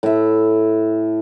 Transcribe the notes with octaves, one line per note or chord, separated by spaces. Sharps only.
A2 E5